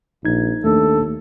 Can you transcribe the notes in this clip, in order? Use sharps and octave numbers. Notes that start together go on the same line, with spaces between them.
A#1 D#4 G#6
D#2 A3 D4 A4